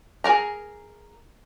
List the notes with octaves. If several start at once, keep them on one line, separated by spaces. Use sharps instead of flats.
G#4 A#4 A#5